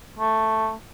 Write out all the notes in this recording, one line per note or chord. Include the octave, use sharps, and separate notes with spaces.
A3